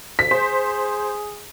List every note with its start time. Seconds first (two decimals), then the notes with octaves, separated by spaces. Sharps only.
0.19 D2 B6
0.31 G#4 C5